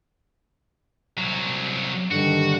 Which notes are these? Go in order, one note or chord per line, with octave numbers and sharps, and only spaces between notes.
C2 F#3
G2 D3 D#3 F#4